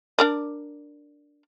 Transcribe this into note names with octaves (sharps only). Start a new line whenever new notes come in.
D4 A#4 D5